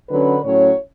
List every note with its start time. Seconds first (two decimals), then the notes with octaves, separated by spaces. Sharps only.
0.10 D3 F#3 C#4 B4
0.44 A2 F#3 C#4 C#5